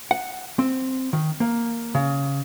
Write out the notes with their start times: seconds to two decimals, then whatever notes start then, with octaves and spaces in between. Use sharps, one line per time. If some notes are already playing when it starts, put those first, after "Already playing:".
0.11 F#5
0.59 C4
1.13 D#3
1.40 A#3
1.95 C#3